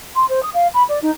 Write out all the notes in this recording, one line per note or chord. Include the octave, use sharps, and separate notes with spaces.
C6
C5
D#6
F5
B5
D5
D#4